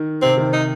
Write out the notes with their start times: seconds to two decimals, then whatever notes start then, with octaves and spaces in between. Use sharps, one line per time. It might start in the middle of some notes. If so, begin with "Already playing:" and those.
Already playing: D#3
0.22 C3 C4
0.37 D#3
0.53 D#4